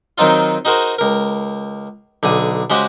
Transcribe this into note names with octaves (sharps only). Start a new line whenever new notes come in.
D#3 F#3 C4 D#4 F4
D#4 F#4 G#4 A#4 C5
C#2 A#4
B1 D3 G#4 G#5
C#3 G#3 F#4 G4 C5 C#5